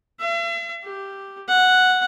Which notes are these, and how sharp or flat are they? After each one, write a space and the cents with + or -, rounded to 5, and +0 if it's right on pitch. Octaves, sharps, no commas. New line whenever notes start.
E5 +45
G4 +0
F#5 -5